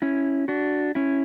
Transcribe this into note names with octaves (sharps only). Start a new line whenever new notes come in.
C#4 E4
D4 F#4
C#4 E4